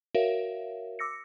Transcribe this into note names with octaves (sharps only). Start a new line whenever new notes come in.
F#4 A#4 C#5 E5 F5
D6 E6 A#6 C#7